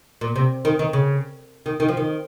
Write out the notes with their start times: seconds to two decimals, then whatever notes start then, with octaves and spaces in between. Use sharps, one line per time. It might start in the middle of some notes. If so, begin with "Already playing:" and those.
0.21 A#2
0.36 C3
0.65 D#3
0.79 D#3
0.93 C#3
1.66 D#3
1.80 D#3
1.88 F3
1.97 D#3